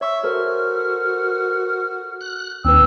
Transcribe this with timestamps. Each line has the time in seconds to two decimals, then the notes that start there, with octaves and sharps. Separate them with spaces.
0.01 C#5 E5 C#6 E6
0.24 F#4 A4 A#4 C5 F6
2.21 F#6
2.65 D#2 C4 B4 E6